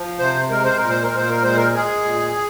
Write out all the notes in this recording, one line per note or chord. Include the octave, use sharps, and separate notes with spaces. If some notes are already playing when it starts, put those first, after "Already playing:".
Already playing: F3
C3 C5
G#3 A#4
C5
A#2 A#4
C5
A#4
A#2 C5
A#4
G#3 C5
A#4
G#3 G#4
A#2